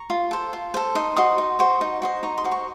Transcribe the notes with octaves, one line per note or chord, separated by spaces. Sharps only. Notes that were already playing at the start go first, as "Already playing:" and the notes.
Already playing: A#5 C#6
F4
A4 C5
F4
A4 C5
D#4 C6 D#6
F#4 C5 D#5 C6 D#6
D#4
F#4 C5 D#5
D#4
F#4 C5 D#5
D#4 A#5 C#6
C6 D#6
F#4 C5 D#5
A#5 C#6